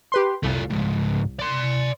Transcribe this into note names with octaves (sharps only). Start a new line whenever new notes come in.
G4 B4 C6
C2 A3 F4
C#2 G#2
D5 C6